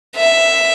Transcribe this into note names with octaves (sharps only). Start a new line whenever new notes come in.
E5